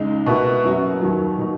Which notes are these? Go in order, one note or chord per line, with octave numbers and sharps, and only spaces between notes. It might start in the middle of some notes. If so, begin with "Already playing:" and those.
Already playing: C#2 G#3 D#4
B2 A#3 E4 B4
F#2 E3 B3 F#4
D#2 D#3 F#3 A#3
B2 F#3 A#3 D#4